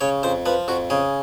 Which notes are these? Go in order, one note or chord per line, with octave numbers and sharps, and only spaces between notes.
C#3 C#5
F2 C5
F3 B4
F2 F#4
C#3 G#4